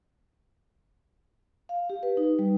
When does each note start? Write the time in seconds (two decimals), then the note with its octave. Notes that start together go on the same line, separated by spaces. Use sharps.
1.69 F5
1.90 G4
2.03 B4
2.17 D#4
2.39 G3